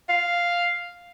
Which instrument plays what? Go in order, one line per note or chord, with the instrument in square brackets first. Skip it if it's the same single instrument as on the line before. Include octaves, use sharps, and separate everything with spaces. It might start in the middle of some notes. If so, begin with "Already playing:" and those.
[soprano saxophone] F5